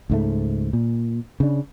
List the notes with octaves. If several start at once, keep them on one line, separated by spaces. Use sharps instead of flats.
C#2 G#2 A3
A#2
C#3 D4